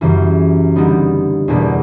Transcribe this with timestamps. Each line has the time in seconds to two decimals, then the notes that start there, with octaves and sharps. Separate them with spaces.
0.01 F#2 C#3 E3 G3
0.76 D3 G3 B3 D#4
1.48 E2 B2 G3 A#3 D4